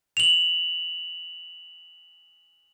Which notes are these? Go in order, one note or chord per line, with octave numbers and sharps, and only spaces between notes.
F7 F#7